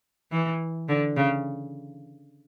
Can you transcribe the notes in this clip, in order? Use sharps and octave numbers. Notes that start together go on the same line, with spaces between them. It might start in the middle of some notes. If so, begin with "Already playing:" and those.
E3
D3
C#3